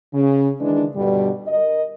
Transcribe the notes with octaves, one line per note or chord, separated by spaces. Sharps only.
C#3
D#3 E3 G#3 D4
G2 B2 D3 G3
A#4 D#5